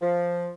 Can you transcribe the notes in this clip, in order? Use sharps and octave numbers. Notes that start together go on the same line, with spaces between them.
F3